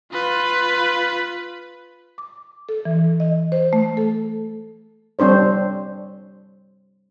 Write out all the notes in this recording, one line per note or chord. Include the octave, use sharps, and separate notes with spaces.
F4 B4
D6
A4
E3
D#5
C5
A3
A4
G3 C4 D4 C5 C#5